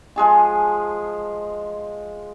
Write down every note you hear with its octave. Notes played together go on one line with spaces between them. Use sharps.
F3 G#3 G#4 G#5